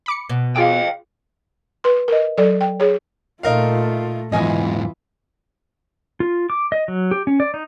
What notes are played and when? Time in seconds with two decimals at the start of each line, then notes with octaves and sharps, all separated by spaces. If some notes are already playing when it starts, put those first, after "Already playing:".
0.06 B5 D6 C#7
0.29 B2
0.56 F4 G#4 F5 G5 D6
1.84 B4 C6
2.08 A#4 D#5
2.38 F#3 A4 D5
2.61 G5
2.80 G#4 C#5
3.43 A#2 A3 D#4 F4 A#4 F5
4.32 E2 G#2 E3 F4 D#5 G#5
6.20 F4
6.50 D6
6.72 D#5
6.88 F#3
7.11 G4
7.27 C#4
7.40 D5
7.54 D#4